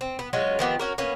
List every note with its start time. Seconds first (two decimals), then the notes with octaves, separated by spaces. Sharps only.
0.01 C4
0.19 B3
0.33 F#3 G#3 C#4 F4
0.59 D#3 F3 B3 G4
0.79 C#4 F#4 A#4
0.98 A#3 B3 C#4